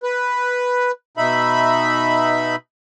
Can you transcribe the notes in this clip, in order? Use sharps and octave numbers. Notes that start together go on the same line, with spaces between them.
B4
B2 D#4 E5 B5